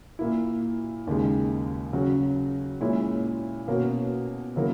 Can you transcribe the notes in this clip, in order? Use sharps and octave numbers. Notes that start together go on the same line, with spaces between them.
A#2 A#3 E4
D#2 C#3 G#3
C#3 F#3 C#4 F#4
A#2 G#3 C#4 E4
B2 A#3 C#4 F#4
C#3 F#3 A#3 E4